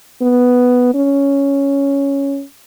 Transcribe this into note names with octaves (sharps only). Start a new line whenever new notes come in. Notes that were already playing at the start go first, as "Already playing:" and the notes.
B3
C#4